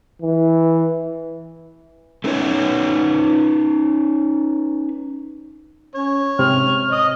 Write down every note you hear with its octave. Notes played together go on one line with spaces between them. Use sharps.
E3
A3 C#4 D#4 A#4 B4 C#5
C#4 C#5
G#2 C3 C4 F6
D#5 D#6